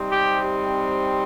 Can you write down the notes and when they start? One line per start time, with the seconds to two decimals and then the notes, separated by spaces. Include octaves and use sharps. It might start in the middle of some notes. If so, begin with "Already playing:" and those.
Already playing: C3 G3 C4 D#4
0.10 G4